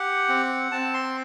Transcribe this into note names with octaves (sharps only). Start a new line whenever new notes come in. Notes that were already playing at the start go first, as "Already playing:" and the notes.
Already playing: G4 F#5
C4
C4 A5
C6